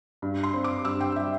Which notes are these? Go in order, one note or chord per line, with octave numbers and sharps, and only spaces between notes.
G2
C6
C4
D6
G2 E6
G5
G3 E5